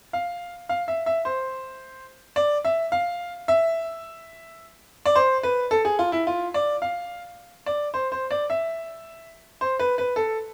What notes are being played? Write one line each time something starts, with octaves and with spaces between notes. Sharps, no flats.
F5
F5
E5
E5
C5
D5
E5
F5
E5
D5
C5
B4
A4
G#4
F4
E4
F4
D5
F5
D5
C5
C5
D5
E5
C5
B4
B4
A4